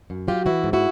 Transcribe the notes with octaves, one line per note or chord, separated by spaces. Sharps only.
F#2
F#3 F4 G4
E3 E4 F#4
G#2
E4 F#4